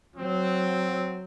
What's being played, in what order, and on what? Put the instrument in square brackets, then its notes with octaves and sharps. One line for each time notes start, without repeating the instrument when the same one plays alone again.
[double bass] F#3 [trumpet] C4